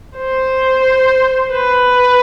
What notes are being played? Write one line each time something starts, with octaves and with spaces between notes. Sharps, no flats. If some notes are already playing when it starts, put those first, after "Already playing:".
C5
B4